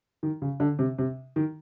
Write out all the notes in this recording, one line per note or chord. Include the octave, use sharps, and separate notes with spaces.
D#3
C#3
D3
C3
C3
D#3